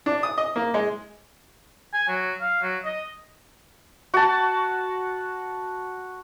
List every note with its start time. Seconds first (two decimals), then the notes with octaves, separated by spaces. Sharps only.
0.06 D4
0.23 D#6
0.38 D#5
0.56 A#3
0.74 G#3
1.93 G#5
2.08 F#3
2.41 F5
2.62 F#3
2.85 D#5
4.14 F#4 A5